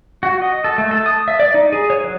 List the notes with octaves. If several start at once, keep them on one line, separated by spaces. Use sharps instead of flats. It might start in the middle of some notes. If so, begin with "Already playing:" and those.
F#4
D#5
A4
A3
A4
D#6
E5
D5
D#4
G#4
C#5
F#3